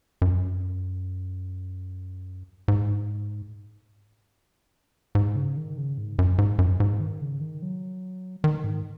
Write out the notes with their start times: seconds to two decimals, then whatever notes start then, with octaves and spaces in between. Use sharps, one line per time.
0.22 F#2
2.68 G#2
5.15 G#2
5.36 C#3
5.57 D#3
5.77 C#3
5.98 G#2
6.19 F#2
6.38 G#2
6.58 F#2
6.80 G#2
7.00 D#3
7.21 C#3
7.41 D#3
7.62 F#3
8.44 D#3
8.64 G#2